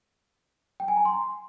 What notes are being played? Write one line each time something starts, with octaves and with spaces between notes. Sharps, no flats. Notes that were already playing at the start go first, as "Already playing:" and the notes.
G5
G#5
A#5
C6